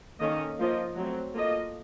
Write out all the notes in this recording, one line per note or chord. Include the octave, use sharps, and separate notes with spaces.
D#3 A#3 C#4 A4 D#5
F3 A#3 F4 C5 D#5
F#3 A3 C4
A#3 F4 A4 D#5